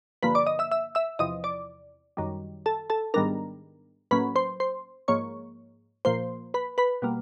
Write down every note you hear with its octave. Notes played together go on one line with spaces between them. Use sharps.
G2 D3 F3 A#3 B4 B5
D5 D6
D#5 D#6
E5 E6
E5 E6
E5 E6
E2 C3 F3 D#5 D#6
D5 D6
F#2 D#3 G3
A4 A5
A4 A5
G#2 D#3 G3 B3 D4 A#4 A#5
A2 F#3 A#3 C#4 B4 B5
C5 C6
C5 C6
G#2 F3 A#3 C#5 C#6
A#2 F3 A#3 C5 C6
B4 B5
B4 B5
B2 G3 A#3